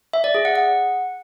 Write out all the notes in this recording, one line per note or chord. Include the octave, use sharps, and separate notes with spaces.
E5
D5
G#4
F#5
F#5